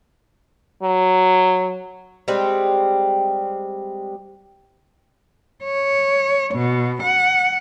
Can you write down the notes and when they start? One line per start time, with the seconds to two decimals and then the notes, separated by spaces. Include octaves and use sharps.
0.83 F#3
2.28 G3 G#3 C4
5.64 C#5
6.55 B2
7.03 F#5